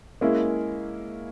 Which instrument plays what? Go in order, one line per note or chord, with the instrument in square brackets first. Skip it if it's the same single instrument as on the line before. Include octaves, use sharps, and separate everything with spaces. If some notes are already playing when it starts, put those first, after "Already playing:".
[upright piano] G#3 C#4 E4 [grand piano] A#3